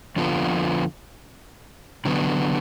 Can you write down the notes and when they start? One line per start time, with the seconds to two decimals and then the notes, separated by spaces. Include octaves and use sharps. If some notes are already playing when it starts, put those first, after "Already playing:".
0.16 F2 D3 F3 B3 F4
2.05 D3 F#3 B3